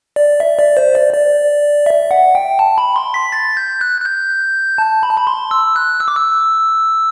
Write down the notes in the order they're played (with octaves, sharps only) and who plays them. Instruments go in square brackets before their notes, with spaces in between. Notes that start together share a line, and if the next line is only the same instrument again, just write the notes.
[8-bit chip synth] D5
E5
D5
C5
D5
D5
E5
F#5
G5
A5
B5
C6
B6
A6
G6
F#6
F#6
G6
A5
B5
A5
B5
C6
E6
F#6
E6
D6
E6